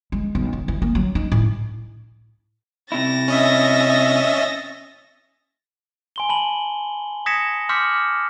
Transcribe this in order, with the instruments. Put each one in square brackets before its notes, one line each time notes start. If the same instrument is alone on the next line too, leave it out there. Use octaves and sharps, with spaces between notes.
[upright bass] G#3
B1
E3
E3
A#3
F#3
D#4
A2
[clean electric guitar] C3 E4 [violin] A6 A#6
[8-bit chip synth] C#4 D#5 E5
[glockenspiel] G#5 C6 G7
A5 B5 F#7
D#6 G#6 A#6 B6 C#7 E7
C6 D6 F6 G6 B6 C#7